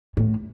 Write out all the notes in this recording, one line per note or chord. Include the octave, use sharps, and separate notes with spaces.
A2